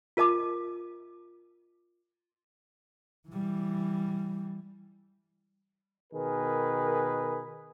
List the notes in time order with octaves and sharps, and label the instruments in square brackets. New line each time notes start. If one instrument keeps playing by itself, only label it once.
[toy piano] F4 A#4 D#5 A5 D6
[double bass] E3 G3
[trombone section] B2 D#3 G#4 A#4 B4